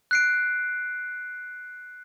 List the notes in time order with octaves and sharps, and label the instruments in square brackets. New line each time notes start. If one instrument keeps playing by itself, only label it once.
[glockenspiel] F#6 C7 D7